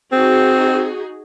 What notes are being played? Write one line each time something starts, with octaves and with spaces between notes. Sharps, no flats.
C4 D#4 F#4 G#4